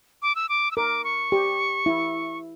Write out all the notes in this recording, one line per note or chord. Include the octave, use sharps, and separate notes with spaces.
D6
E6
D6
E6
A#4 D6
C#6
G4
E4